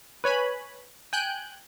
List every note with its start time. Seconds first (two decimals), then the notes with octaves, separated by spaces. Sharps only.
0.24 B4 C#5 G#5 B5
1.13 G5 G#5 F#6 G6